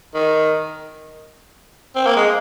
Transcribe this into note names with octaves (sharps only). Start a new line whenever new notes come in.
D#3
C4
A#3
G#3